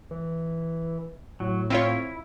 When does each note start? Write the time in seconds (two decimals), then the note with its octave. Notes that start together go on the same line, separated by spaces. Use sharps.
0.11 E3
1.40 A2 F#3
1.70 C4 E4 F4 C#5